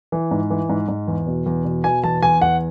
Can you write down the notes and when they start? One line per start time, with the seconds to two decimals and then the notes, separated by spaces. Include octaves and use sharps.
0.12 E3
0.31 G#2
0.50 E3
0.69 G#2
0.88 G#2
1.08 E2
1.27 B2
1.46 E2
1.65 B2
1.84 B2 G#5
2.04 E2 A5
2.22 E2 G#5
2.41 E2 F#5